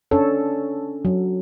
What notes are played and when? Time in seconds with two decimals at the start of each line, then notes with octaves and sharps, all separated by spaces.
0.11 C#4 D4 A4 C#5
1.05 F#3